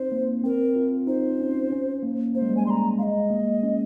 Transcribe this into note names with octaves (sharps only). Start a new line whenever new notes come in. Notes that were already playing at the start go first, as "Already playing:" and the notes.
Already playing: C4 D#4 C5
A#3
C4 A#4
F4
D#4 C5
C#4
C#4
A#3
A#3 C5
G#3
G3
G#3 G#5
G3 A#5 C6
G#3 D#5 F5
A#3
C#4